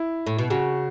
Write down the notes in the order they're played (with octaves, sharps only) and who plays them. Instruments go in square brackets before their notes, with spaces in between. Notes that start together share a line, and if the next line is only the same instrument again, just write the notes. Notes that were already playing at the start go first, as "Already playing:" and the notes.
Already playing: [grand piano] E4
[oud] A2
B2
[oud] C#3 [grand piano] F#4